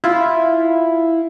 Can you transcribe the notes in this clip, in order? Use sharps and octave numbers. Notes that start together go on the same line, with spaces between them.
E4 F4